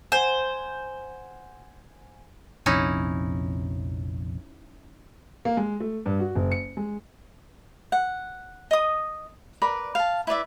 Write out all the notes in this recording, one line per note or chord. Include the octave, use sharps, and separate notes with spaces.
C5 F#5 G#5 G6
A#1 F2 C3 C#4 D#4 E4
A#3
G#3
A3
G2
F#4
F#1
C#7
G#3
F#5
D#5 D#6
A#4 B4 D5 B5
F5 A5
E4 B4 D5 E5